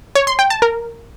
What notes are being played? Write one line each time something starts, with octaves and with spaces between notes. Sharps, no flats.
C#5
C6
G5
A5
A#4